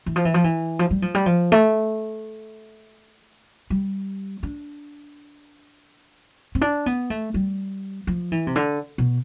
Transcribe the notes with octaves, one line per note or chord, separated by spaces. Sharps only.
E3
F3
E3
F3
E3
F3
G3
F3
G3
F3
A3
G3
D4
C4
D4
B3
A3
G3
F3
E3
C3
D3
B2